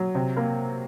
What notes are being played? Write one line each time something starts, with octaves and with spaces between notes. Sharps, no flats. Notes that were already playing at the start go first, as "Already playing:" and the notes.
Already playing: F#3
C3
A#3